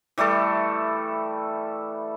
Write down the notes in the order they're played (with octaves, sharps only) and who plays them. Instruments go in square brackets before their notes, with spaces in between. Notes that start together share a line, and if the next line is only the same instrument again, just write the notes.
[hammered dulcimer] E3 G3 A3 A4